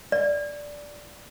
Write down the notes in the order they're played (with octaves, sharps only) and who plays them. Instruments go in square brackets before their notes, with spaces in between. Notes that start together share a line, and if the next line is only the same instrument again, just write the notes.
[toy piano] D5